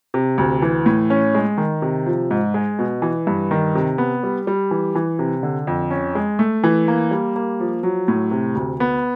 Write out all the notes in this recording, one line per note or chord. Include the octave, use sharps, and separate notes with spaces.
C3
D2
E3
A2
C#4
G#3
D#3
C3
F3
G#2
G#3
B2
E3
G2
D#3
C3
B3
G3
G3
E3
E3
C3
D3
F2
C#4
G#3
A3
E3
A#3
G3
A#3
F3
F#3
A2
C3
D2
B3